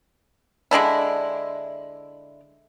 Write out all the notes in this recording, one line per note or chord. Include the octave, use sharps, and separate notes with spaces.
D3 G#3 D4 E4